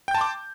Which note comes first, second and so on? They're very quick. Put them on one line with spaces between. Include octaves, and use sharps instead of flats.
G5 G6 A5 C6 D6